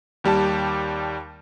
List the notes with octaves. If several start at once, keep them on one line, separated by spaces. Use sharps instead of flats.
D#2 G3 G4 A5